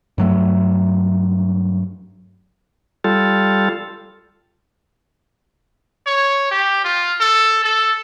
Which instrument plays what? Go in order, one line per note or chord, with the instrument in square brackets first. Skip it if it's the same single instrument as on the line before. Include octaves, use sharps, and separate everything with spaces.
[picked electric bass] G2 F#3 A3
[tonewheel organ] G3 F4 A4
[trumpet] C#5
G4
F4
A4
A4